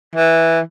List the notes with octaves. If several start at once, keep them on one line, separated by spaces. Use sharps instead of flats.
E3